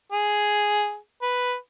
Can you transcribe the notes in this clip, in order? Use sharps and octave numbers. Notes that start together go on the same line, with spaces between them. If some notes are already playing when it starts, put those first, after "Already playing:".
G#4
B4